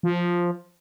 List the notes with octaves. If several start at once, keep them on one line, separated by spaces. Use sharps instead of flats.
F3